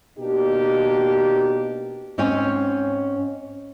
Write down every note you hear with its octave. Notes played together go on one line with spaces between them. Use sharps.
B2 A#3 D4 D#4 G4
G#2 C4 C#4 C5 C#5 G#5